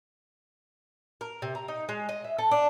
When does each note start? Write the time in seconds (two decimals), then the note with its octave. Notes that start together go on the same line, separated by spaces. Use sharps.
1.21 A#4
1.42 C3
1.55 A#5
1.68 D#4
1.89 G#3
2.09 D#5
2.24 E5
2.38 A4
2.51 D4